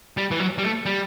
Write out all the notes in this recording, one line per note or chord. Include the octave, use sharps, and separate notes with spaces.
G3
E3
F#3
G3
A3
G3